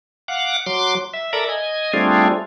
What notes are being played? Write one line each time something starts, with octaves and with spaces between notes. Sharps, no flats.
F5 F#5 D6
F#3 C6 D6
E5
A4 A#4 D5 E5 A#5 B5
D#5 G#5
G3 A3 C4 D4 F4 G#4